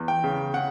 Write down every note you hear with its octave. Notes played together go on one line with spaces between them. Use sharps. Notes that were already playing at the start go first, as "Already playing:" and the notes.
Already playing: E2
G5
C#3
C#3 F#5